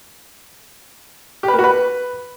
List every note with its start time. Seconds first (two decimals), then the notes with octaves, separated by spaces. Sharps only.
1.43 G4
1.48 B4
1.53 A#3
1.59 F#4
1.64 B4